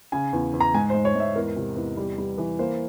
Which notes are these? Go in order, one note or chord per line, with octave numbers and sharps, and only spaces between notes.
C#3 G#5
E2
E2
A#5
G#2 G#5
C5
G#2
C#5
G#2 E5
E2 A#4
C3
E2
G3
G3
E3
A#3 C5